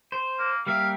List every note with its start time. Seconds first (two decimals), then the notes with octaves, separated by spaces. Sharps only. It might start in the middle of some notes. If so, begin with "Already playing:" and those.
0.12 C5
0.39 A#3
0.67 G3 A#3 E5 F5